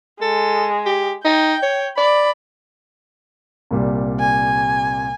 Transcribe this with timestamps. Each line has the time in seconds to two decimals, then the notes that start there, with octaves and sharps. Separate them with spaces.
0.21 G#3 A4
0.86 G4
1.25 D#4 G5
1.62 C#5
1.97 D5 B5
3.71 C2 A#2 G3
4.20 G#5